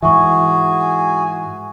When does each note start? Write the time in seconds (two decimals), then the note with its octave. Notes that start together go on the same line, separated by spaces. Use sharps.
0.02 G#2 E3 F#4 G#4 E5 G#5 C#6